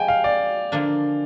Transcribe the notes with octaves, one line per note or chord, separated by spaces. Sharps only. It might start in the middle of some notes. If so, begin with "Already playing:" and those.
Already playing: F3 G#3 D#4 G4 G5 G#5
F5
D5
D3 F3 A#3 D4